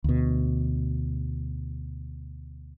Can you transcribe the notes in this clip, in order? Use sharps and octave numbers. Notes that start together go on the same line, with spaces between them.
D2 B2